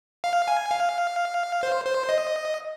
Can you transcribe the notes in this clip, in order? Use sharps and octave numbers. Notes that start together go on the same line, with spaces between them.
F5
G#5
F5
C5
C5
D#5